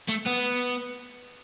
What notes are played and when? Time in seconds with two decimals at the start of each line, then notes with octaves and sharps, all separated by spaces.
0.09 A3
0.27 B3